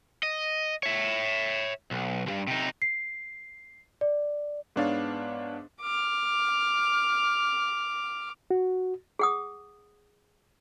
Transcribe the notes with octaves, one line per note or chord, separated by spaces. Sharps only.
D#5
C#5 E5
B1
C2 G2
C3 D#4
C7
D5
G#2 B3 D4 C#5 F5 A6
D6 F6
F#4
G#4 F#5 D#6